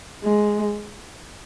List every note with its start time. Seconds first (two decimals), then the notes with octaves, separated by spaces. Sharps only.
0.24 G#3